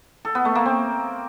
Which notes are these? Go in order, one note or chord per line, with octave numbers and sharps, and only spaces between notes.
A4
B3
A3
A#3
C4